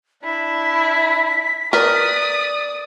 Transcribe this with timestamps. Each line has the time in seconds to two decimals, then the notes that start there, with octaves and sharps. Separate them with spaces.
0.24 D4 E4 B6
1.73 A#4 B4 D5 D#6